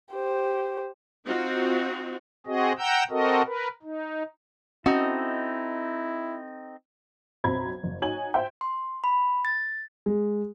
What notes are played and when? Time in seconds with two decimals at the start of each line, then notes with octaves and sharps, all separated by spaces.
0.14 G4 C5
1.26 C4 D#4 F4 F#4
2.46 C4 F#4 G#4 D#5
2.78 F#5 G5 A#5 E6 G6
3.10 C4 F#4 A4 A#4 D#5
3.46 A#4 B4
3.83 D#4
4.86 C4 C#4 D#4 E4 F#4 A4 D#5
7.44 B1 F#2 C4 A#5 B5 G#6
7.83 F#1
8.02 D#4 F#4 C#5 G#5 G#6 F#7
8.34 C5 E5 G5
8.61 C6
9.04 B5
9.45 A6
10.06 G#3